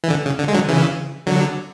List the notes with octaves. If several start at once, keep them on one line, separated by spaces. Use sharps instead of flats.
E3
D3
C#3
D3
G#3
D3 F#3
C#3 E3
D3 F#3